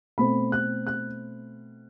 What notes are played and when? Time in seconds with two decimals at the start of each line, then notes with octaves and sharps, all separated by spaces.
0.18 B2 A3 C4 B5
0.52 F#6
0.87 F#6